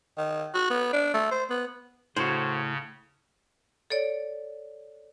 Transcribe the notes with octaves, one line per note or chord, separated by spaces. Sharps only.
D#3
F#4
B3
D4
A3
C5
B3
A2 C#3 F#4 C5
A4 C#5 D5